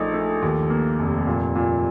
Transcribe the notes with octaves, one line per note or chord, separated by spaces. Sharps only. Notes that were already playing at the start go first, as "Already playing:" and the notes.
Already playing: A#1 A3 D#4
A3
D#2
A#3
F1
A#2
A#2